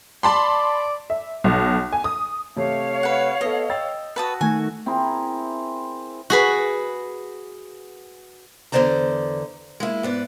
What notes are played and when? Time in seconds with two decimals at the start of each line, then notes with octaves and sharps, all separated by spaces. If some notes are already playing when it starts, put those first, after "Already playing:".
0.23 D5 A5 B5 C6
1.10 E5
1.44 B1
1.93 G#5
2.04 D#6
2.56 C3 A3 C#5 F5
3.03 B4 F#5
3.41 B3 A4 D#5
3.70 G5 E6 A6
4.16 F#4 B4 A5 D#6
4.41 D#3 A3 G#5
4.86 C4 E4 G#4 A#4
6.30 F#4 G#4 B4
8.72 E2 D3 E3 C5 D5 A#5
9.80 G#3 A#3 E4
10.03 G#2 B3 D5